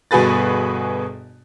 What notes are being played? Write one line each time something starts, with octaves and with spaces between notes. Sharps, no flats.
G1 B2 F#4 G#4 B4 A6